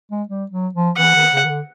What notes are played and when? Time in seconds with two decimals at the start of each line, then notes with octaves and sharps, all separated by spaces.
0.11 G#3
0.29 G3
0.52 F#3
0.75 F3
0.97 E3 F#5
1.15 D#3
1.33 C#3
1.45 D#3
1.49 D3